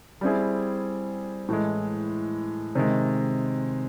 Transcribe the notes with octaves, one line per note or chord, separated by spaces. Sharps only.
G3 C4 E4 G#4
A2 E3 G#3
C3 D#3 G#3